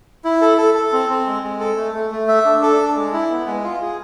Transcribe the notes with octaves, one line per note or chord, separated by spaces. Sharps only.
E4
A4
A4
A4
C4
C4
G#3
G#3
A4
A3
A3
A3
E5
D4
A4
D4
G#3
E4
B3
G#3
F4
G#4